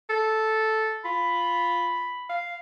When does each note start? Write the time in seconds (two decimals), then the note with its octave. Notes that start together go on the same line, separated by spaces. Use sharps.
0.10 A4
1.05 F4 B5
2.29 F5